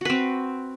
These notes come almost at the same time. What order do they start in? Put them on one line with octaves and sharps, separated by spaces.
F#4 B4 C4